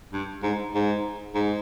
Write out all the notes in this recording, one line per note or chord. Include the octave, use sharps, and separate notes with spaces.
G2
G#2
G#2
G#2